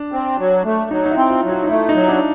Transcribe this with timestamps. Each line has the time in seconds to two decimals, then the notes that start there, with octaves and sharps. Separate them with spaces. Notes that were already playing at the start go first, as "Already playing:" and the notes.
Already playing: D4
0.12 C4
0.38 F#3
0.64 A3
0.90 F#3 D#4
1.05 D#4
1.11 E4
1.17 C4
1.30 F4
1.44 F#3
1.50 F4
1.64 D#4
1.69 A3 E4
1.89 D#4
1.95 F#3
2.08 D4